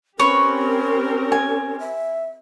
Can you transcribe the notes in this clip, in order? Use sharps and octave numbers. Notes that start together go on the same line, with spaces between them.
C4 C#4 G4 A#4 B4 C#5 C#6
G#5
E5